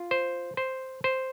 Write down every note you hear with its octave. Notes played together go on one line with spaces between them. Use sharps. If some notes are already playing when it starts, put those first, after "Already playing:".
Already playing: F4
C5
C5
C5